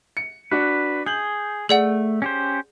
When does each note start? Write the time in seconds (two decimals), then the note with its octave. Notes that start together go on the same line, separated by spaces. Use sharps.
0.17 C#7
0.51 D4 F#4 B4
1.06 G#4 G6 F#7
1.69 A3 G#4 D5 F#5
2.22 C#4 G4 C5